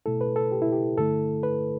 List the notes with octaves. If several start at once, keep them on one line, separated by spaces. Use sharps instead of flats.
B2 A3 E4 A4
B4
A4
G4
E4
G4
G2 D3 A3 E4 A4
B4